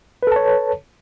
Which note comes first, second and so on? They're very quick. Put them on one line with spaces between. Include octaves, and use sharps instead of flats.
B4 A4 A5 C#5